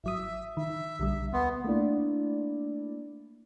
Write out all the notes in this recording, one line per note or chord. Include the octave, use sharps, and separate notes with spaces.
G#1 F#3 E5 D#6
D#3 E5
B1 D3 G3
D2 B3 C6
A3 A#3 D4 E4 D5